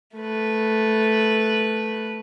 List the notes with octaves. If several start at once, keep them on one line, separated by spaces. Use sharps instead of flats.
A3 B4